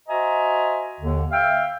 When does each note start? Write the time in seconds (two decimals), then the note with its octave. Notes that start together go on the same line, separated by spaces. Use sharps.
0.09 F#4 C5 D#5 E5 G#5 A#5
1.00 D#2 D3
1.32 E5 F5 G5